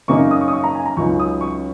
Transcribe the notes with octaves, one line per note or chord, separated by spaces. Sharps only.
F#2 C#3 A#3 D#4 C#6
D#6
C#6
D#6
C#6
A#5
G#5
A#5
C#2 C#3 F#3 D#4 C#6
D#6
C#6